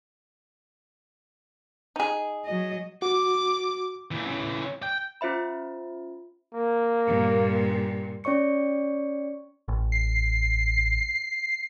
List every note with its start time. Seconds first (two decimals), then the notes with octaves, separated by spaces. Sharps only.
1.96 D#4 G#4
2.45 F#3 D#5
3.02 F#4 D6
4.11 A#2 E3
4.26 C#3 E3
4.83 G5
5.21 C#4 F4 C5 E5 B5
6.54 A#3
7.07 G2 A#2
8.24 C#4 C#5 D5 C#6 C#7
9.68 A1
9.92 C7